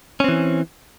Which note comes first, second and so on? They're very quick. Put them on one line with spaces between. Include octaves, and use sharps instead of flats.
C#4 C4 E3